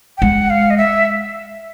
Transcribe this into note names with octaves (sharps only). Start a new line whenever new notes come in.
G5
G#3 F#5
F5
D#5
E5